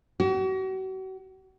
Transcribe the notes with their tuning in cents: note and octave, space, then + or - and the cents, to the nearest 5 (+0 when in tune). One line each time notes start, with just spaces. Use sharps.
F#4 +40